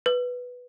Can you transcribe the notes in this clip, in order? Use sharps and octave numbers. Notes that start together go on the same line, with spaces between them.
B4